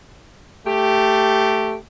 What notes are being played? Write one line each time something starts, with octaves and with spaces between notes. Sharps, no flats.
A3 G4